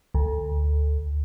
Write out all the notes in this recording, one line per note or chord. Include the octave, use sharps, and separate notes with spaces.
D2